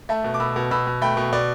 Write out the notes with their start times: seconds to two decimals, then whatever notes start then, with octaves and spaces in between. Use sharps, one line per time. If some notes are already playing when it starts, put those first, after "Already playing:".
0.09 A3 E5 A5
0.24 B2
0.34 D6
0.40 B2 B5 E6
0.56 B2
0.71 B2 B5 E6
0.87 B2
1.02 A3 G5 B5
1.17 B2
1.33 B2 D5